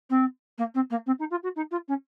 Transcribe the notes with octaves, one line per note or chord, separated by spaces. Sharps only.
C4
A#3
C4
A#3
C4
D#4
F4
F#4
D#4
F4
C#4